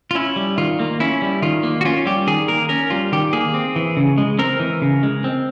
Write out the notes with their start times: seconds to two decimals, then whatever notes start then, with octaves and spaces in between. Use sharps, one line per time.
0.11 F4
0.15 C#4 E4
0.36 G3
0.58 D#3 F4
0.79 A#3
1.00 C#4 E4
1.22 G3
1.42 D#3 F4
1.63 A#3
1.81 F#4
1.85 C#4 F4
2.06 G3 G4
2.27 D#3 G#4
2.48 A#3 A#4
2.69 C#4 A#4
2.90 G3 F4
3.12 D#3 G4
3.33 A#3 G#4
3.54 C4
3.76 E3
3.97 C#3
4.18 G#3
4.39 C4 A#4
4.60 E3
4.82 C#3
5.03 G#3
5.24 C4